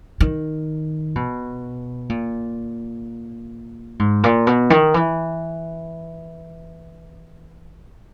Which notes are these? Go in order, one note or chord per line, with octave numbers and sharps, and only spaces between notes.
D#3
B2
A#2
G#2
A#2
B2
D#3
E3